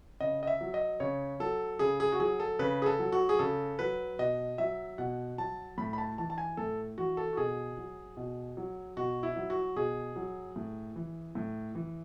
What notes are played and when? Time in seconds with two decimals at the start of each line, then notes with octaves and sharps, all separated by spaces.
0.20 C#3 D#5
0.43 D#5
0.47 E5
0.61 F#3
0.74 D#5
1.00 C#3 C#5
1.40 F#3 A4
1.79 C#3 G#4
2.00 G#4
2.12 F#4
2.20 F#3 G#4
2.40 A4
2.59 C#3 B4
2.82 G#4
2.86 A4
2.99 F#3
3.12 F#4
3.29 G#4
3.39 C#3 A4
3.79 F#3 B4
4.19 B2 D#5
4.58 F#3 E5
4.98 B2 F#5
5.38 F#3 A5
5.78 A2 B5
5.93 B5
5.98 A5
6.18 E3 A5
6.30 A5
6.38 G#5
6.57 A2 A4
6.98 E3 F#4
7.17 A4
7.33 F#4
7.37 B2 G#4
7.77 F#3
8.17 B2
8.57 F#3
8.97 B2 F#4
9.23 E4
9.36 F#3
9.50 F#4
9.76 B2 G#4
10.16 F#3
10.56 A2
10.96 E3
11.35 A2
11.75 E3